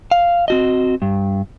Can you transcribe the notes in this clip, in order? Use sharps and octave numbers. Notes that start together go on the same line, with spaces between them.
F5
C4 F#4 D#5
G2